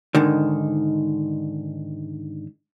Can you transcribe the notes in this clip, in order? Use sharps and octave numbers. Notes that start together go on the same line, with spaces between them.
G#2 D3 D#3